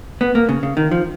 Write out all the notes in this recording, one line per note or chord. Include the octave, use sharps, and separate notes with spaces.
B3
A#3
C#3
C#3
D#3
F3